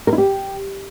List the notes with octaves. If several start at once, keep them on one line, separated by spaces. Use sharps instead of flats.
A#4
E4
G4